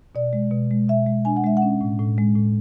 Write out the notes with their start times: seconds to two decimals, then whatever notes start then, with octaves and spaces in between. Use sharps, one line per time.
0.15 B2 D5
0.33 G#3
0.52 B2
0.71 G#3
0.88 B2 E5
1.06 G#3
1.25 D4 G#5
1.37 F#5
1.44 G#3 E5
1.57 F#5
1.62 C#4
1.81 A2
1.99 A2
2.18 G#3
2.35 A2